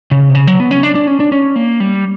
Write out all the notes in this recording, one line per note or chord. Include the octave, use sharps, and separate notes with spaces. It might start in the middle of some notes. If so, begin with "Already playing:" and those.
C#3
C3
C#3
F#3
B3
C#4
D4
D4
C#4
D4
C#4
A#3
G3